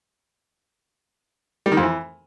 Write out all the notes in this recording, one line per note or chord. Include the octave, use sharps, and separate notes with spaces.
G3
D#3
F2
E3